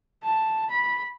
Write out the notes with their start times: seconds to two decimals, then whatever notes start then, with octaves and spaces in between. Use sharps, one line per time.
0.23 A5
0.70 B5